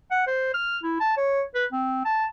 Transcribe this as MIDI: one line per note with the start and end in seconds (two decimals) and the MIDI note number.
0.11 0.25 78
0.27 0.51 72
0.54 0.78 89
0.83 0.96 64
1.00 1.15 81
1.17 1.42 73
1.55 1.65 71
1.72 2.01 60
2.05 2.26 81